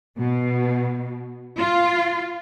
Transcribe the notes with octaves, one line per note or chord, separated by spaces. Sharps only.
B2
F4